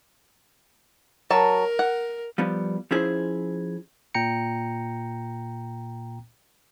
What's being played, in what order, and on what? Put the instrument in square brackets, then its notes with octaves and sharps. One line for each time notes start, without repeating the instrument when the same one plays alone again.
[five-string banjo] F#3 A5 [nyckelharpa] A#4
[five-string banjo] F#5
[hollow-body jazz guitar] F3 G3 B3
F3 C#4 E4 G#4 C5
[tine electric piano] A#2 G5 A#5 C#7